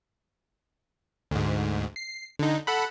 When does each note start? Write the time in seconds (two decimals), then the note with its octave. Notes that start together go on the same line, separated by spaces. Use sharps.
1.31 D2 G#2
1.96 C7
2.39 D3 D#4
2.67 A4 F#5 B5